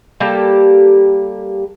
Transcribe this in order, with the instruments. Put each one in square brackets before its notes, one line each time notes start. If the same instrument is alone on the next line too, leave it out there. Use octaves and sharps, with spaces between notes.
[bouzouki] G3 A#3 G4 A4